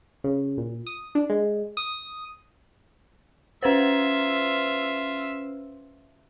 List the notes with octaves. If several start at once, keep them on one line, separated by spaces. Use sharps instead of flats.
C#3
A#2
D#6
D4
G#3
D#6
C#4 F4 B4 C5 E5